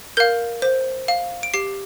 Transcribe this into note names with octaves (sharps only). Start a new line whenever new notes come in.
A#4 F5 G6
C5
F5
D7
G4 C7